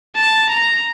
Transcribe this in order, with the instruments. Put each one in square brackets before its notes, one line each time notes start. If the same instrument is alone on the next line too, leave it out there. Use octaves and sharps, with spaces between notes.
[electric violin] A5
A#5